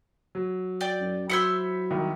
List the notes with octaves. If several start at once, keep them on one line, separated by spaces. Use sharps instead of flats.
F#3
D5 G5
F#2
F#3 E4 C5 E6 G#6 B6 C#7
C2 D#3